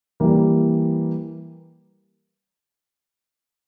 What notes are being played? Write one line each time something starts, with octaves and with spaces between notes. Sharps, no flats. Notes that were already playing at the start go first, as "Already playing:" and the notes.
E3 G3 A#3